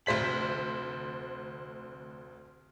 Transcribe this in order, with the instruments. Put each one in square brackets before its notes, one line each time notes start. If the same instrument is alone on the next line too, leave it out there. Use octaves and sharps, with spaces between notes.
[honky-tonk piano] F1 D2 C5 B6 F#7